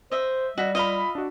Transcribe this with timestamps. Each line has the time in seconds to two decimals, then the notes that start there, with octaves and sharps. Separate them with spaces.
0.12 C5 D#5 E5
0.58 G3 F#4 D#5 E6 B6
0.75 F4 D#5 F5 B5
1.15 D4 F#4